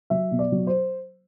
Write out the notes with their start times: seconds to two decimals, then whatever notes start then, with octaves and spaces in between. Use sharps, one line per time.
0.10 F#3 E5
0.31 B2
0.39 D5
0.52 F#3
0.67 C5